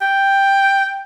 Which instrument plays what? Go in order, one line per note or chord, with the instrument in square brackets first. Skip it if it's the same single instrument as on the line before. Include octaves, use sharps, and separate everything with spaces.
[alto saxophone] G5